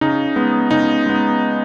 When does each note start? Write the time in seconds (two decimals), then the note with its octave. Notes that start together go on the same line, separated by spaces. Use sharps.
0.01 C#3 D#4
0.36 G#3 B3
0.71 C#3 D#4
1.06 G#3 B3